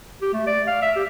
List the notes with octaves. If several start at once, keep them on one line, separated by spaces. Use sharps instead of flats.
G4
A3
D5
F5
E5
G4